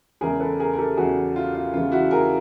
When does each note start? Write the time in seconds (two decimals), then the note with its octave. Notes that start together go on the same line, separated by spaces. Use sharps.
0.21 E2 C#3 E3 G#3 G#4 A#4
0.40 A4 B4
0.60 G#4 A#4
0.74 A#4
0.78 G4 A4
0.97 E2 C#3 E3 G#3 F#4 G#4
1.36 F4
1.55 F4
1.73 E2 C#3 E3 G#3 F4
1.92 E4 F#4
2.11 G#4 A#4